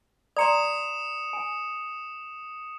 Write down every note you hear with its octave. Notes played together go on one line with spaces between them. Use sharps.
D5 A#5 C6 D#6 C#7 E7
G#5